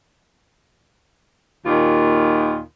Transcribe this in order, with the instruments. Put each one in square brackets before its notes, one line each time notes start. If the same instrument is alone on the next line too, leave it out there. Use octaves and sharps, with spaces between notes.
[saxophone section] D#2 A#2 D#3 F4